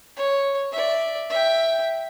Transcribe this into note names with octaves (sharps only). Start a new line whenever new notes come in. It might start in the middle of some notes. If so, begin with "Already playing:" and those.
C#5
D5 E5
E5 G5